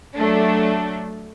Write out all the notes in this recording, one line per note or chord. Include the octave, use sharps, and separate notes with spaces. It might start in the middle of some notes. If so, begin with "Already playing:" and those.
F#3 A3 D4